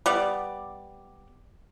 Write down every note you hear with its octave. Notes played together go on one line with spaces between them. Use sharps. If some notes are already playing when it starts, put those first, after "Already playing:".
G3 B3 D5